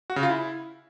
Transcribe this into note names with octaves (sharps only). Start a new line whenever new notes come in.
F#4
C#3
F4
E4